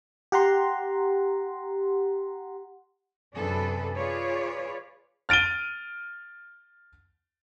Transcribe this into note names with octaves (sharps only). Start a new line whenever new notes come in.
G4 F#5 A#5 C6
F#2 C3 D4 G#4 A4 B4
F4 G#4 B4 C#5 D5
F6 A6 D7 D#7 G7